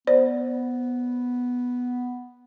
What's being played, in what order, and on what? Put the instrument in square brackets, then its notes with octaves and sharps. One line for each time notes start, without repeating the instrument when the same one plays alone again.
[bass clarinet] B3 [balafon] C5 D5